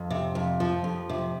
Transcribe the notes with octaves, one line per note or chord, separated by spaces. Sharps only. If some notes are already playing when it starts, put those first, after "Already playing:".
Already playing: F2
C3
F2
F3
F2
C3